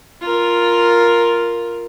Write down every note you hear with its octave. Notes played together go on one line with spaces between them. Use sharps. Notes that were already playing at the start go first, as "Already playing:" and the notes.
F4 A#4